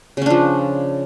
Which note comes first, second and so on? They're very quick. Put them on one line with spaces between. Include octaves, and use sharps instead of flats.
C#3 C#4 D4 F3